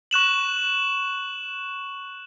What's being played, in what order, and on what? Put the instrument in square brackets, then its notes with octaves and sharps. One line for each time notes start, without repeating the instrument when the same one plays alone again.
[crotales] C#6 F#6 E7 F#7